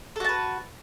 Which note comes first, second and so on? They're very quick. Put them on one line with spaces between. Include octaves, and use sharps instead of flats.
A4 F#4 A5 B4